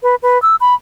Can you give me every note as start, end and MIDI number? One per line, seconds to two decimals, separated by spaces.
0.03 0.15 71
0.23 0.40 71
0.42 0.56 88
0.60 0.74 83